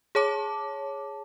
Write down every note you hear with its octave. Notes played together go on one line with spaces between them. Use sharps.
G#4 C#5 A5 D6